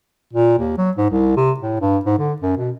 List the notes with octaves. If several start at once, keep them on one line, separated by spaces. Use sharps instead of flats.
A#2
D#2
F#3
G#2
C2
C3
A2
G2
G#2
D3
F#2
B2